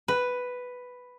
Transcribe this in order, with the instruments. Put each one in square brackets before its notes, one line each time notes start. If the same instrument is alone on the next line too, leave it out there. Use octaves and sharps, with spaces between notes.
[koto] B4